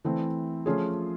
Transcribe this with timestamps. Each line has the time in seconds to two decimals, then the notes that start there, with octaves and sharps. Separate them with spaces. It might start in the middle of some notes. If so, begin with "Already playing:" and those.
0.04 E3 A3 C4
0.66 F3 A3 C#4 F4 G#4